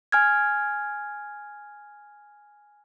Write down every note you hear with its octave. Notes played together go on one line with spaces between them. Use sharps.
G#5 F6 G#6